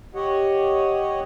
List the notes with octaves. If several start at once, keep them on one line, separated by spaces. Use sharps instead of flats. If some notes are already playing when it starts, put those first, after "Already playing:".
G4 C#5 D#5 F#5